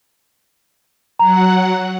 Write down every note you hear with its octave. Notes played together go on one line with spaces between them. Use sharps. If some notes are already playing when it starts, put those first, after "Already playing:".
F#3 F#5 A#5